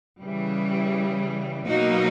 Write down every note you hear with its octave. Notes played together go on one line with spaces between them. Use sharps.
C#3 E3 G3
B2 F#3 A#3 D#4 F#4